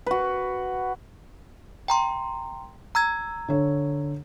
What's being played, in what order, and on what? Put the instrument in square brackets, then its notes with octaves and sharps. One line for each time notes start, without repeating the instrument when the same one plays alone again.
[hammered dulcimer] F#4 B4
[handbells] G5 A#5 C6
A#5 E6 G#6
[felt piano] D3 C#5